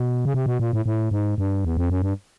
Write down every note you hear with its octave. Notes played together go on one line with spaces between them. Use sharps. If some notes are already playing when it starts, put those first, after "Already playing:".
Already playing: B2
C#3
C3
B2
A#2
A2
A2
G#2
G2
E2
F2
F#2
G2